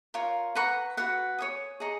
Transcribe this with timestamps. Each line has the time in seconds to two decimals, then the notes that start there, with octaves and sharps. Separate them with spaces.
0.14 F4 A#4 C#5
0.55 B4 F#5 A#5 C#6
0.97 F#4 B4 F#5
1.38 C#5 G#5 D#6
1.80 G#4 D#5 A#5 C#6